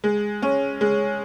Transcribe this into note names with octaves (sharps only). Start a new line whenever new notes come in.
G#3
C#4
G#3